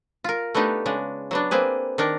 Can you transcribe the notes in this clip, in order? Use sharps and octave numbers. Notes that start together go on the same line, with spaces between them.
F4 A#4
A3 B3 D4 D#4 G4
C#3 G#3 D4
F#3 B3 D4
A#3 C4 G#4 B4
D#3 D4 A#4